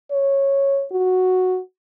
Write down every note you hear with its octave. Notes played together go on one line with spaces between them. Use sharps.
C#5
F#4